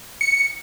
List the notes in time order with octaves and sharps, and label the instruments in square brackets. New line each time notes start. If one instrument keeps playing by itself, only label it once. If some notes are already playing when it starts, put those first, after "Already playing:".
[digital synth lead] C#7